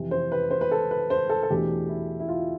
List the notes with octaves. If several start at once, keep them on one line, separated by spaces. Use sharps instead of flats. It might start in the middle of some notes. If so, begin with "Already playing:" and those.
Already playing: F2 C3 E3
C5
B4
C5
B4
A4
B4
C5
A4
A4
E2 B2 A3 D4 G4
E4
E4
F4